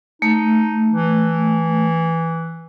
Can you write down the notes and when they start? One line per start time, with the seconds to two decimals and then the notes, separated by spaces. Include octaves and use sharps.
0.22 A3 D#4
0.90 E3